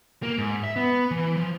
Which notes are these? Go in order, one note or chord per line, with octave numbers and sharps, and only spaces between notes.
A#3
G#2
E5
B3
E3
F3